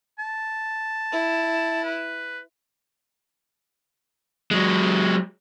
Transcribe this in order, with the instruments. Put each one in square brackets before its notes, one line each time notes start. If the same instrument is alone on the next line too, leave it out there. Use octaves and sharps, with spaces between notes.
[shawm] A5
[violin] E4
[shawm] B4
[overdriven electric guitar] F#3 G#3